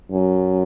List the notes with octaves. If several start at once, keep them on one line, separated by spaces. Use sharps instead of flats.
F#2